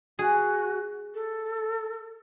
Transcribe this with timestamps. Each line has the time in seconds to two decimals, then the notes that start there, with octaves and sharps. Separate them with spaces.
0.19 F#4 G#4
1.15 A4